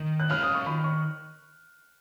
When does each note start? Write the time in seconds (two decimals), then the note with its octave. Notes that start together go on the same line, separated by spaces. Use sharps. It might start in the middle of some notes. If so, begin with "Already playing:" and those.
Already playing: D#3
0.20 F#6
0.29 F#3 C#4 F4 F6
0.43 D#6
0.55 C#6
0.66 D#3 B5
0.84 C#6